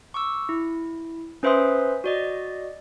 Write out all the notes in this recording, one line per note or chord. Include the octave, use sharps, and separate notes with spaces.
C#6 D6 E6
E4
C#4 B4 C5 E5 C6 D#6
F#4 D5 D#5